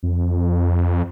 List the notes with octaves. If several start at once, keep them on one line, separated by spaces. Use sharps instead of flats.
F2